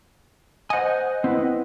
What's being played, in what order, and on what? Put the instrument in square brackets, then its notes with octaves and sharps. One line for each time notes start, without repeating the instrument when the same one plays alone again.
[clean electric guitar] C5 G#5 [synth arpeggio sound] D#5 F#5
[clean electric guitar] C4 E4 B4